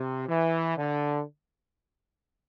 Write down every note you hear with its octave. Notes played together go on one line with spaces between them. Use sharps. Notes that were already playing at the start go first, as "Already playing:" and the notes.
Already playing: C3
E3
D3